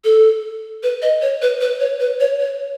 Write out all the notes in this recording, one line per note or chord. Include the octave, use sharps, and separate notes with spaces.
A4
B4
D#5
C#5
B4
B4
C#5
B4
C#5
C#5